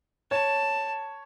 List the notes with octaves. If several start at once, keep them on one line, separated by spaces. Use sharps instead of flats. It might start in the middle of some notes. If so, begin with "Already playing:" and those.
C#5 A5